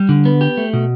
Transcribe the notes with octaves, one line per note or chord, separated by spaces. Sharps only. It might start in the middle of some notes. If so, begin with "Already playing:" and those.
Already playing: G3
D3
B3
G4
A3
B2